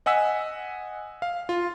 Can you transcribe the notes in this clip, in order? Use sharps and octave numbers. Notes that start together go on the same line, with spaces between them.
D#5 F#5 G#5 E6 B6
F5
F4